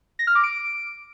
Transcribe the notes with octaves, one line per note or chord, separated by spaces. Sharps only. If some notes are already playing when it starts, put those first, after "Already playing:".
A#6
F6
D6
D7